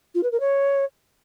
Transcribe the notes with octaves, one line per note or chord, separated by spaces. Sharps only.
F4
B4
A#4
C#5